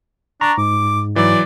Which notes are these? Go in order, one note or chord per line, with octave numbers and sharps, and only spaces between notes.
D4 A#5 C#6 A#6
G#2 D6
E3 F#3 D5